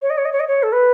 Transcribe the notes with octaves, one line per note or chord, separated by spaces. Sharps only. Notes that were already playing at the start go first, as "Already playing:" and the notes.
C#5
D#5
C#5
D#5
C#5
D#5
C#5
A4
B4